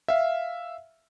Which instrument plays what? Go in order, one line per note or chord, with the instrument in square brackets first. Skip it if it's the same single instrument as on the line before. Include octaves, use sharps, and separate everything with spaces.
[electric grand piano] E5 F5